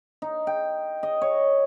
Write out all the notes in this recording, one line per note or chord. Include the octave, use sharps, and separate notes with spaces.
D#4
G5
D#5
C#5